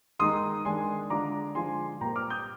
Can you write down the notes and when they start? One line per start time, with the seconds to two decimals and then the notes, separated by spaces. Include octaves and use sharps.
0.19 D#3 G#3 D#4 C6 D#6
0.65 D#3 G#3 D4 G#5 C6
1.10 D3 G#3 D4 F4 A#5 D6
1.55 D3 F3 G#3 G#5 C6
2.01 A#2 G3 C4 G5 A#5
2.16 D6 F6
2.30 D#6 G6